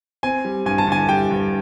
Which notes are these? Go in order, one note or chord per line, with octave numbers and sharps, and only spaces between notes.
C4 G#5
G3
G2 G#5
A5
D3 G#5
G3 G5
G2